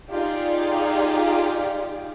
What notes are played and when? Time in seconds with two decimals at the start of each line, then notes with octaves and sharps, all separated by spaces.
0.11 D#4 F4 G4 G#4 D5